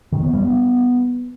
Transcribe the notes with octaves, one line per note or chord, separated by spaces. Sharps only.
D#3
B3
G3
B3